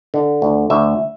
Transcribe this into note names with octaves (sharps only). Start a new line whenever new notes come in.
D3
D2
D2 E5